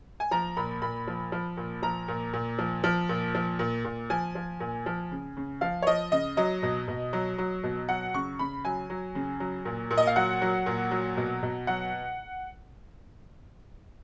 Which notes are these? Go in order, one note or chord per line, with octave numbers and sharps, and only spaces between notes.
G#5
F3 A#5
A#2 B5
A#2 B5
F3
F3
A#2
F3 A#5
A#2
A#2
F3
F3
A#2
F3
A#2
A#2
F3 G#5
F3
A#2
F3
C#3
C#3
F3 F5
C#5
F3 D#5
C#3 D#5
F#3 D#5
B2
B2
F#3
F#3
B2
F#3 F#5
C#3 C#6
C#3 B5
F#3 G#5
F#3
C#3
F#3
A#2
A#2
D#5
F5
F#3 F#5
F#3
A#2
F#3
B2
B2
F#3 F#5